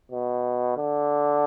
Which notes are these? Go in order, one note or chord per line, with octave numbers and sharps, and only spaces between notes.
B2
D3